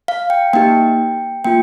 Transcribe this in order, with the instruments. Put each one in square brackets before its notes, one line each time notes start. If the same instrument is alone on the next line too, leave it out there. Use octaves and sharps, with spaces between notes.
[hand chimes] F5
G5
A#3 D#4 G4 G5
A#3 F4 G5